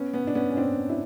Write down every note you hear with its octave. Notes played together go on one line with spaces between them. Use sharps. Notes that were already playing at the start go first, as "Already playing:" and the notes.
Already playing: B3 C#4
B3 C#4
D4
B3 C#4
C#4
C4 D4
D4 E4